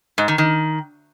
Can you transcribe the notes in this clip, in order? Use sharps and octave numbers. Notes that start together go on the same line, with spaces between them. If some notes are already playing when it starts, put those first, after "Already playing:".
G#2
D#3
D#3